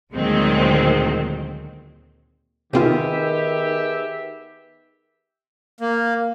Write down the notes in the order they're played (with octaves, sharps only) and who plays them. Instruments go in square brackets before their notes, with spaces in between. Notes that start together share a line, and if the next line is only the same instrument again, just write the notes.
[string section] D2 A#2 D#3 F#3 G#3 C4
[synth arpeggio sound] C3 C4 F4 [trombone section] D#3 [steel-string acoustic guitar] B3 G#4 [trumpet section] G4 E5
[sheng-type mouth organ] A#3